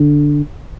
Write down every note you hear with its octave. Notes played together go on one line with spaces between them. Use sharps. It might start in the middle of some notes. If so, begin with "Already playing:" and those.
Already playing: D3